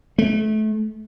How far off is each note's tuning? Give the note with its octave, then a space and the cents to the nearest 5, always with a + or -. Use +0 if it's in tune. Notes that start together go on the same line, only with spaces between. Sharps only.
A3 -30